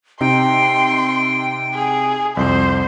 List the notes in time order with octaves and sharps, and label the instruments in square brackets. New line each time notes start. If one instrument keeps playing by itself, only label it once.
[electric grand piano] C3 D#4 [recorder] G5 [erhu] C6
[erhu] G#4
[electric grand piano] C2 F2 C7 [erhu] C5